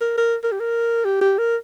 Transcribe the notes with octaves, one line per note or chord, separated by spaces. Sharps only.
A#4
A#4
A#4
G4
A#4
G4
G4
A#4